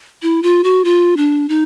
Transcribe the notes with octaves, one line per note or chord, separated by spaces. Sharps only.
E4
F4
F#4
F4
D4
D#4